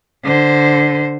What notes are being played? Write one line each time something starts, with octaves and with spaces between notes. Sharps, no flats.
D3 C5